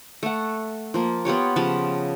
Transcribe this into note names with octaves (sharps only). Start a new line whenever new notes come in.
A3 F#5
F3 A#3
B3 F4 G4 C#5
C#3 F3 A5 B5